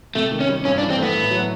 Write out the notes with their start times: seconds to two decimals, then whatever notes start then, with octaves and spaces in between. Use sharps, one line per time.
0.15 C3 A3
0.32 D#3
0.40 C#4
0.49 G3
0.65 G2 C#4
0.78 D4
0.82 E3
0.90 C4
0.98 A3 B3
1.15 A2
1.31 F#3